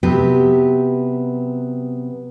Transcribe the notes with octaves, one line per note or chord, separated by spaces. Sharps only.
C3 F#3 B3 G4 B4